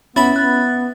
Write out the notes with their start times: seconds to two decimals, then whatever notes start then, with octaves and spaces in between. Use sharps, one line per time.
0.16 B3 C#4 E4 B5 A6
0.36 B3 F#6 A6